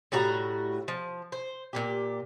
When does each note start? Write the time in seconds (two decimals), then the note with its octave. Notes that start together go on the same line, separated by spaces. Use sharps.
0.12 A2 G3 F#4 A#5
0.88 F3
1.32 C5
1.73 A#2 C#3 G4